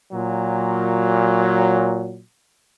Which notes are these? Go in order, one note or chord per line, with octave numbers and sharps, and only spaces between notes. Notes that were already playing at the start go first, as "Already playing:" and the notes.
A#2 F#3